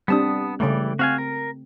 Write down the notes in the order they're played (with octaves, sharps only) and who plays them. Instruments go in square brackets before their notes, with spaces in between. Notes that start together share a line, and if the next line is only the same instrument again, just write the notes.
[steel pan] G3 C4 D4 [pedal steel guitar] B3 A5 D#6
[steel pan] C#3 A3 [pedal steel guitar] E3 G3 D5
[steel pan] C4 [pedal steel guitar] F#4 F5 G#5
[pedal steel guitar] A#4